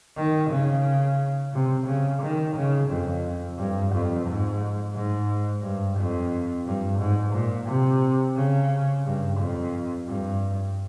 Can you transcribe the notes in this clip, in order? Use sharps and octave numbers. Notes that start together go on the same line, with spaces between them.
D#3
C#3
C3
C#3
D#3
C#3
F2
G2
F2
G#2
G#2
G2
F2
G2
G#2
A#2
C3
C#3
G2
F2
G2